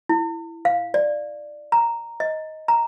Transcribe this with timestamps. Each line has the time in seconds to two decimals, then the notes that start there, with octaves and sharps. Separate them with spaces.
0.09 E4
0.65 F5
0.94 D5
1.72 A#5
2.20 D#5
2.68 A#5